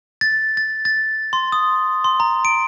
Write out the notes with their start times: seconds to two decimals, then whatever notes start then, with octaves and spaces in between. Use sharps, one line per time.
0.21 A6
0.57 A6
0.85 A6
1.33 C6
1.52 D#6
2.04 C6
2.20 A#5
2.45 D7